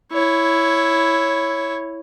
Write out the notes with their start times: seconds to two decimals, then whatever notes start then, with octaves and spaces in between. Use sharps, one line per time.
0.12 E4 C#5